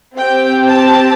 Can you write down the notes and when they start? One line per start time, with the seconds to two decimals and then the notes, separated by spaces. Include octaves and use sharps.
0.16 C4 G4 G5
0.69 A5